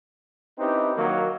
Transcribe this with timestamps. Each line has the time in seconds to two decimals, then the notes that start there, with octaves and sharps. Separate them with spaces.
0.59 C4 C#4 D#4 E4 G4 B4
0.96 D#3 F#3 A#3